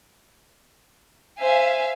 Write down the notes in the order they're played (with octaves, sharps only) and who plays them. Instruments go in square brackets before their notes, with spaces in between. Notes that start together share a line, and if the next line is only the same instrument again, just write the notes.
[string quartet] C5 [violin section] E5 F5 G#5